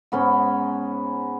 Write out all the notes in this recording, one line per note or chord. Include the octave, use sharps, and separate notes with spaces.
G#2 B3 C#4